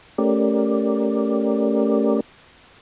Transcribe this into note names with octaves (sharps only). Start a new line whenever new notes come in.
A3 C#4 G4 A#4 D5